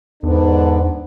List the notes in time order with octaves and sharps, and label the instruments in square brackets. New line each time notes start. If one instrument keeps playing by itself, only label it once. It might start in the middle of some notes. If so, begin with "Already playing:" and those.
[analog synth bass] E2 [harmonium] G#2 [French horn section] D3 B3 D4